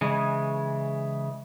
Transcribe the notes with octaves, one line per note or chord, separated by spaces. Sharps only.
C#3 E3 G#3